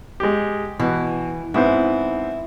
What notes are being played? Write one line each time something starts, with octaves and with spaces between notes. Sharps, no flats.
G#3 G4
B2 E3
G#2 B3 C4 E4